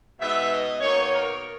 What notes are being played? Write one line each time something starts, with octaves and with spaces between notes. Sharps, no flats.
B2 G#3 B3 D#4 E5
D#5
B2 A#3 D#4 C#5
A#4